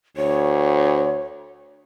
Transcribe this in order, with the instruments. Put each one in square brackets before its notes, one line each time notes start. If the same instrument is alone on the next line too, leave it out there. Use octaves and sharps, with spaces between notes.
[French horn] D2 [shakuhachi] C#5